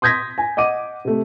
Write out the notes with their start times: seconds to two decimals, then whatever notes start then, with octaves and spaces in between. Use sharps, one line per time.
0.02 C6 D#6 G6 G#6 A#6 B6
0.38 G#5
0.57 D#5 F#5 D6 D#7
1.05 C3 A3